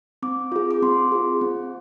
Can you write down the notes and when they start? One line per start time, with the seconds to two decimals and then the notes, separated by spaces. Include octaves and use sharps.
0.23 C4 D6
0.52 F4 G#4
0.71 D6
0.82 C4 C6
1.12 F4 G#4
1.41 C4